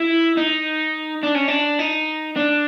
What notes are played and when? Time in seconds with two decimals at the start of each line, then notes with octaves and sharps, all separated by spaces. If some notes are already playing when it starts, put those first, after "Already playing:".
Already playing: E4
0.37 D#4
1.23 D4
1.35 C#4
1.48 D4
1.79 D#4
2.36 D4